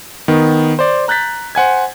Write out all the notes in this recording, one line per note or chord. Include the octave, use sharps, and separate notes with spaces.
D#3 B3
C5 D5
A#5 F#6 G6 A6 B6
C5 F#5 G#5 G#6